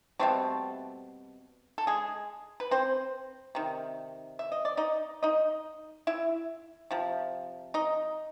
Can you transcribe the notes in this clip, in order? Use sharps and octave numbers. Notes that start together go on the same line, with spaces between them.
B2 G3 A3 C4 A4
A4
G#3 G#4
B4
C4 C5
C3 D#3
E5
D#5
D5
D#4 D#5
D#4 D#5
E4 E5
C3 F3
D#4 D#5